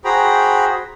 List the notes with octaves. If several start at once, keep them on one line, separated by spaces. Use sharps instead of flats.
F#4 G#4 C5 G5 A#5 B5